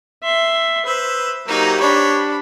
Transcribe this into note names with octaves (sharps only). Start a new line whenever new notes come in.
E5 C6
B4 C5 E6
F#3 A#3 D#4 G4 C5
D4 C#5 B5